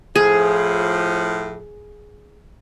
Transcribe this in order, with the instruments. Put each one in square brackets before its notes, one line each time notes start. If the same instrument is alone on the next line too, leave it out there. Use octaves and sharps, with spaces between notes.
[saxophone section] A2 F3 [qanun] G#4